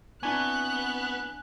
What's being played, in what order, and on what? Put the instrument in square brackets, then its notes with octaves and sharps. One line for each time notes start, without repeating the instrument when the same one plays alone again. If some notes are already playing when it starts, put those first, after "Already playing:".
[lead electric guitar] B3 [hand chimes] C4 E4 C#6 [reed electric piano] D4 G#5 [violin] F#6